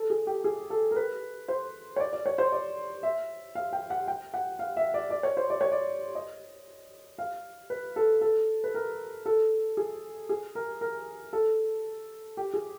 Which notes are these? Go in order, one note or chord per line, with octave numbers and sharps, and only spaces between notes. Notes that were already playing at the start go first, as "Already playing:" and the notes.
Already playing: A4
G#4
G4
G#4
A4
A#4
B4
C5
C#5
D5
D5
C#5
C5
D5
E5
F5
G5
F#5
G5
F#5
F5
E5
D5
D5
C#5
C5
D5
C#5
D5
D#5
F5
B4
A4
A4
B4
A#4
A4
G#4
G#4
A#4
A#4
A4
G4
G#4